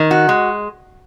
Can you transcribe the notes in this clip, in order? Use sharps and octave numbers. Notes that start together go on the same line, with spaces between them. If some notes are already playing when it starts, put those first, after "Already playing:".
Already playing: D#3
F#4
G#3